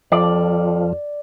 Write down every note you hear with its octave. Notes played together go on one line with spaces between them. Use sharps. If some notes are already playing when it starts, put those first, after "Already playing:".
F2 F3 D5